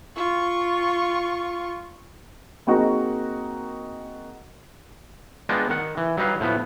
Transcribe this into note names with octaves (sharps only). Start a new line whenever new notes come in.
F4 C#6
A#3 C4 D#4 F#4 G#4 A#4
G#3 B3 D4 F4 D#5 G5
D#3 F#5
E3
F#3 G3 D#4 B4 F5
A2 F3 B3